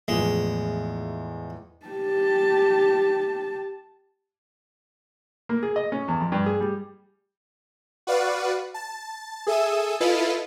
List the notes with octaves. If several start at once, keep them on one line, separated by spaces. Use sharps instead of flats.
E2 A2 F3 G#3
G4 A5
A#3
G#4
D#5
C#4
E2
F2
G2
G#4
G3
F#4 B4 D5 F5 F#5
A5
G#4 A4 E5 D#6 E6 D#7
E4 F4 A4 B4 D#5 F5